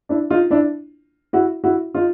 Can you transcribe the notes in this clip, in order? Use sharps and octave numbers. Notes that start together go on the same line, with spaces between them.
D4 E4
D#4 F4
D4 E4
E4 F#4
E4 F#4
D#4 F4